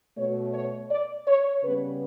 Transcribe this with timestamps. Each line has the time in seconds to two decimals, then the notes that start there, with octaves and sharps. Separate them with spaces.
0.17 B2 A3 C#5
0.54 C#5
0.90 D5
1.28 C#5
1.64 C#3 G3 B3 B4